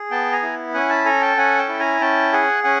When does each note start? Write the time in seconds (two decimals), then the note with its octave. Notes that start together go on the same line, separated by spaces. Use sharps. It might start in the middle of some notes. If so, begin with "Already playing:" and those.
Already playing: G#4
0.11 B3 G5 A5
0.32 G#5 A#5
0.42 E4
0.74 C#4 F#5 G#5
0.90 A5 B5
1.05 A4 G#5 A#5
1.21 G5 A5
1.37 C#4 F#5 G#5
1.58 G5 A5
1.69 E4
1.79 G#5 A#5
2.01 C#4 G5 A5
2.33 G#4 F#5 G#5
2.64 C#4 F#5 G#5